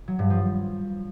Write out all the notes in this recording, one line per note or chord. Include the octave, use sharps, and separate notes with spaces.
F#3
G2
F3